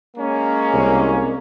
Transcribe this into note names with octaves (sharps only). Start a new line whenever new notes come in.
G#3 A#3 C#4
C2